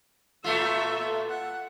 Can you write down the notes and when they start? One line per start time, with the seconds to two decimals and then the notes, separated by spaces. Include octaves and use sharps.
0.44 A#2 A3 F4 A4 E5
1.30 F#5